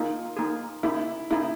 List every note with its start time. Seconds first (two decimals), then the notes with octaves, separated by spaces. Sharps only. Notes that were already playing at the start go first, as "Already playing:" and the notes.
Already playing: A#3 D#4 F4 G#4
0.37 A#3 D#4 G#4
0.83 A#3 D#4 E4 G#4
1.30 A#3 D#4 E4 G#4